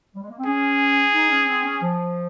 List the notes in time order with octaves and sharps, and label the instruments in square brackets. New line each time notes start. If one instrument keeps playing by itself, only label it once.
[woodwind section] G3
G#3
A#3
C4
[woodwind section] C#4 [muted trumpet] G#4
[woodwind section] D#4
C#4
C4
C#4
F3